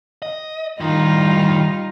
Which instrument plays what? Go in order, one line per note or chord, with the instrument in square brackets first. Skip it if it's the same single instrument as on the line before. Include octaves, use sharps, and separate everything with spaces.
[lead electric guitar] D#5
[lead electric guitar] A2 D#3 [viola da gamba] G3 D#4 F4